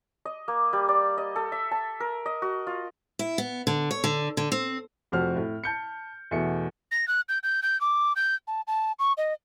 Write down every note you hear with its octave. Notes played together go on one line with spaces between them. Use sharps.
D#5
A#3
G3
D5
D#5
A4
E5
A5
A#4
D#5
F#4
F4
E4
B3
D3
C#5
D3
D3
C4
F1 F2 F#4 C5 F6
A2
A5 G6 C#7
E2 B2 A3 E5 C#7
A#6
F#6
G6
G6
G6
D6
G6
A5
A5
C#6
D#5